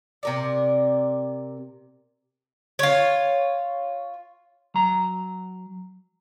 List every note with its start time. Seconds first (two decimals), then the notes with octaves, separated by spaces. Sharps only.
0.23 C3 A#4 D5
2.79 F4 C#5
4.74 F#3 A#5